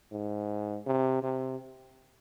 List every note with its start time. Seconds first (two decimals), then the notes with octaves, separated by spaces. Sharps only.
0.12 G#2
0.86 C3
1.23 C3